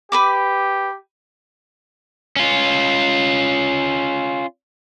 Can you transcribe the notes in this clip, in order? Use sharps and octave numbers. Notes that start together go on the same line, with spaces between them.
G4 B4 B5 D6
C#4 F4